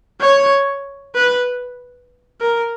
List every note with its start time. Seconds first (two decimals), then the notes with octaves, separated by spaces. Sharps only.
0.21 C#5
1.15 B4
2.41 A#4